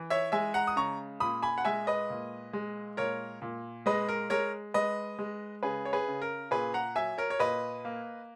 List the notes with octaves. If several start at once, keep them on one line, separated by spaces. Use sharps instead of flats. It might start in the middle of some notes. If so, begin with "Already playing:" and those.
Already playing: E3
C#5 E5
G#3 E5 G#5
F#5 A#5
D#6
C#3 A#5 C#6
A#2 B5 D#6
G#5 B5
F#5
G#3 E5 G#5
B4 D#5
A#2
G#3
A#2 A#4 C#5
A#2
G#3 B4 D#5
A#4
G#3 A#4 C#5
G#3 B4 D#5
G#3
C#3 G#4 B4
C#5
G#4 B4
C#3
A#4
A#2 G#4 B4
F#5 A#5
F#3 E5 G#5
A#4 C#5
C#5
A#2 B4 D#5
A#3